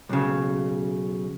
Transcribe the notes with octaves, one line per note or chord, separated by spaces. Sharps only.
B1 C#3